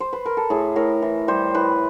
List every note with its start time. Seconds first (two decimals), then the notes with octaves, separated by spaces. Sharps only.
0.00 C5
0.13 B4
0.25 A#4
0.37 A4
0.50 A2 G#4
0.76 A2 A#4
1.02 E3
1.28 G3 C5
1.55 A2 B4